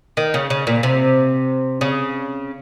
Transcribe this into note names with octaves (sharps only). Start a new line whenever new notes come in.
D#3
C#3
C#3
A#2
C3
C#3